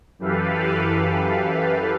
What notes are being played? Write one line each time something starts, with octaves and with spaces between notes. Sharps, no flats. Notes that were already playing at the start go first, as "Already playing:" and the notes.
F#2 E3 G4 A4 B4 F5